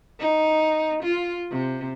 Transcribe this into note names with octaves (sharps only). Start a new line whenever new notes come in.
D#4
F4
C3